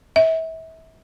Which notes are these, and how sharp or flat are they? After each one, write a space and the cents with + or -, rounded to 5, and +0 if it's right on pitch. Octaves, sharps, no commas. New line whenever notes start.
E5 -35